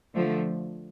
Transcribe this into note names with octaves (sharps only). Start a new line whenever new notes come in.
D3 F3 A3